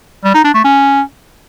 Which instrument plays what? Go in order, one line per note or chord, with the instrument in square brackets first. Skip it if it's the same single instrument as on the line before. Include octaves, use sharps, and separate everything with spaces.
[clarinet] G3
D#4
D4
A3
C#4